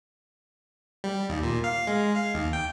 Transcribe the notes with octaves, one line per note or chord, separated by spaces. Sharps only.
G3
D#2
A#2
F5
G#3
F5
D#2
G5